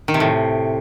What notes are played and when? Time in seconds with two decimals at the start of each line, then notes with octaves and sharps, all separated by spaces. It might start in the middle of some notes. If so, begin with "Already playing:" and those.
0.08 D#3
0.14 C3
0.20 A2